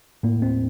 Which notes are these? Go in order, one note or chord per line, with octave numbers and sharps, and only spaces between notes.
A2 A#3
C4